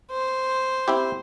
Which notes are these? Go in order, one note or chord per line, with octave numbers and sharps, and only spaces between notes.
C5
C4 E4 G4